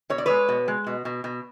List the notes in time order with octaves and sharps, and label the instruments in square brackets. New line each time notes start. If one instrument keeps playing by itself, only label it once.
[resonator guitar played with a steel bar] B2 C#5
D5
G#3 B4 C#5
B2
G#3
B2
B2
B2